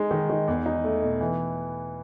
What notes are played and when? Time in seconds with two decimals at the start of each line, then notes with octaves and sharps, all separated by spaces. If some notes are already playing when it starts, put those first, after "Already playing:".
Already playing: G#3 D#4
0.11 D#3
0.30 D#3
0.48 E2
0.66 D#4
0.84 A3
1.03 B2
1.21 E3